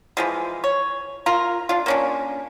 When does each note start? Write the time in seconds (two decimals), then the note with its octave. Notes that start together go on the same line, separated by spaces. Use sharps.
0.17 E3 F3 G#3
0.64 C#5
1.26 F4 A#4
1.69 D4 F4
1.86 A#3 C#4 D4